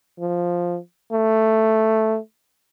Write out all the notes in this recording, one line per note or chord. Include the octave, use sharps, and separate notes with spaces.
F3
A3